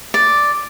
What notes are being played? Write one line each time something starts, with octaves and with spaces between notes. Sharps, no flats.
D5